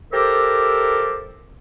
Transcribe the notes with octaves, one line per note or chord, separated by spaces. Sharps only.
G4 A4 A#4 C5 D5 E5